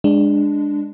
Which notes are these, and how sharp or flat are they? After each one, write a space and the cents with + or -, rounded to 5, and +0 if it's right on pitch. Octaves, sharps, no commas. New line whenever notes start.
G#3 -15 D4 +0